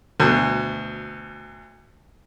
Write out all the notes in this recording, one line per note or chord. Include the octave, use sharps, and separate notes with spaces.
D2 B2